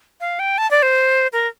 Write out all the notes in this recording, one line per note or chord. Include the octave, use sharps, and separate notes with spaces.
F5
G5
A5
D5
C5
A#4